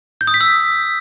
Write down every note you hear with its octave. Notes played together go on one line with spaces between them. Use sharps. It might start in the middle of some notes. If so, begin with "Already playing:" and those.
G6
D#6
B6
E6